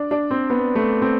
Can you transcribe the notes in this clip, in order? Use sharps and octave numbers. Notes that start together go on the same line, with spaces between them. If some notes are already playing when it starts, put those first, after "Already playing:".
Already playing: D4
D4
C4
B3
A3
C4